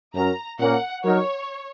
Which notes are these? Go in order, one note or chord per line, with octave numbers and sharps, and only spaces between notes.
F#2 F#3 C#4 F#4 A#4 A#5
A#2 A#3 C#4 A#4 F#5
F#3 D#4 A#4 C#5